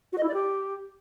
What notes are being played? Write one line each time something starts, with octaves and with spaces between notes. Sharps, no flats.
F#4
D#5
E4
D5
G4